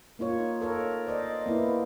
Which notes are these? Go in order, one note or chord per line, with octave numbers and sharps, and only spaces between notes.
A#3 D#4 F4 C#5
A4 A#4 C#5
C5 D5 D#5
A#3 B3 E4